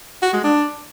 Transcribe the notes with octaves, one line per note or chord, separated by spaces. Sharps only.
F#4
G#3
D4